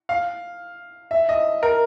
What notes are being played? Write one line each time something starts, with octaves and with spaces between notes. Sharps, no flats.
F5
E5
D#5
A#4